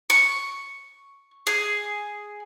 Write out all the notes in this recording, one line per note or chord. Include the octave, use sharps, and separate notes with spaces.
C#6
G#4